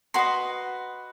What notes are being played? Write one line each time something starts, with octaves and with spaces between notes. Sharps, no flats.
F#4 B4 D#5 C6